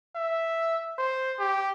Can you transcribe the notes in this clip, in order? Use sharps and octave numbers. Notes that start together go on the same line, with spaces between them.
E5
C5
G4